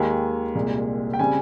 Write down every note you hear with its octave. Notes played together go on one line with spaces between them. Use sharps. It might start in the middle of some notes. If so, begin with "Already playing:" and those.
Already playing: D#2 D#3 G#3 G#5
C2 A#2 G#3
G5
C#3 G3 C4 G#5